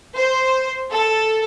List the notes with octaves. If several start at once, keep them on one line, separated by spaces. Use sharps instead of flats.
C5
A4